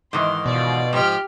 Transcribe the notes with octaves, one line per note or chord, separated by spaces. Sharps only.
G#2 D#3 E3 C6
B2 F4 D5
G#2 F3 G4 F6